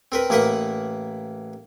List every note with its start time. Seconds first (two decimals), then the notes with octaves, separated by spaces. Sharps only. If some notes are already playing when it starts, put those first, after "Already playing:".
0.12 C4 A#4 B4
0.30 A1 A#3 A#4 B4 F#5